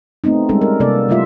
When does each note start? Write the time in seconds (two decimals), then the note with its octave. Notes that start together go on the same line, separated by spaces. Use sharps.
0.24 A3 B3 C4 D#4
0.49 G3 G#3 C#4 A4
0.62 A#4
0.80 C3 A#3 B3 A4 D5
1.09 F#3 G3 A3 E4 F4 E5